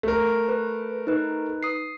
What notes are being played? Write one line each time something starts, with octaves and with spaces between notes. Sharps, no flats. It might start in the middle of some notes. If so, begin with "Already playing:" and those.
A3 A#4
B4
D#4 B4
D#6 C7